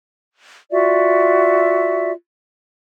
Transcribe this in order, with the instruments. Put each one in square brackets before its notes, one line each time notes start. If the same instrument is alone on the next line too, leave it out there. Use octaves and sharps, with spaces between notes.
[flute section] F4 F#4 D5 E5